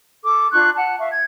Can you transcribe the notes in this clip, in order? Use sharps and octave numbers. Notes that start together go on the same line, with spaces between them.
A4 D6
D4 F4 C#6 F#6
F#5 A5
E5 F5 C#6
G#6